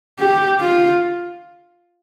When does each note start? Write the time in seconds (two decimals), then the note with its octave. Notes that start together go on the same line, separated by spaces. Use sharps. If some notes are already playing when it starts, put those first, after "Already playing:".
0.19 G4
0.60 F4